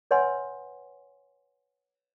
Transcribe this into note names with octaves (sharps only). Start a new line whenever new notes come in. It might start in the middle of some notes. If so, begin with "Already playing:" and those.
B4 C#5 D#5 F#5 G#5 C6